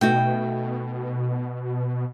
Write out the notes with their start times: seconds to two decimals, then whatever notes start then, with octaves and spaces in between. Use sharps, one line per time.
0.01 B2 A3 D#4 F#4 G5